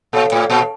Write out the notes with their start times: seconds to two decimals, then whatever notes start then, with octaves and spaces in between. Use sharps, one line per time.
0.13 A#2 A4 C#5 F5
0.32 A2
0.50 A#2